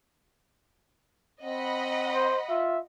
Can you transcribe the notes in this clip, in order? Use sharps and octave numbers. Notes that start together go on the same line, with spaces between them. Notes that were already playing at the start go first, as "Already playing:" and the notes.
C4 D#5 F#5 B5
C5
F4 E5